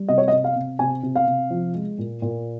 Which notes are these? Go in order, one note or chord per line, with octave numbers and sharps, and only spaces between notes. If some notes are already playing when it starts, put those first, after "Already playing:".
Already playing: G3
C3 D#5
C#5
D#5
C3
F5
C3
C3 G#5
C3
F5
C3
F3
G#3
A#2
A#2